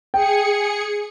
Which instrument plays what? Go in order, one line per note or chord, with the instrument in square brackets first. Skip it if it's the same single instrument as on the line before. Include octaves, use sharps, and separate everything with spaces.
[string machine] G#4 C#7 [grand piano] G5